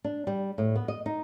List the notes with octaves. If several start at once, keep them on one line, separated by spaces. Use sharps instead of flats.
D4
G3
A2
B3
D#5
D#4